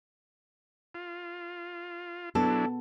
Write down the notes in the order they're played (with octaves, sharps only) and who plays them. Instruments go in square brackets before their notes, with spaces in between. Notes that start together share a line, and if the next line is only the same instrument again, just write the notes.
[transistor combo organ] F4
[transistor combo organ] F#3 D4 E4 [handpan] B3 [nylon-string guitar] A4